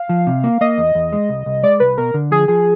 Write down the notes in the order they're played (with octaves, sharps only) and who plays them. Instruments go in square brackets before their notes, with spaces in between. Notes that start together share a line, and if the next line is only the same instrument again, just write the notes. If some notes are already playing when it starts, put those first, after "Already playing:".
Already playing: [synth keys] F5
[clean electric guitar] F3
C3
A#3
[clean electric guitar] A#3 [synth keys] D#5
[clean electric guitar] E2
E2
G#3
C2
C2
[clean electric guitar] G#3 [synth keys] D5
[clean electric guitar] C2 [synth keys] B4
[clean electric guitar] B2 [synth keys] A#4
[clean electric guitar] D3
[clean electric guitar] F3 [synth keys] G#4
[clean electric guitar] F3 [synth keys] G#4